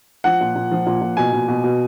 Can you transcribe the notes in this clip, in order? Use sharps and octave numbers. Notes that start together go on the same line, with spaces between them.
F3 F#5
A#2
A#2
F3
A#2
A#2
B2 G#5
B2
B2
B2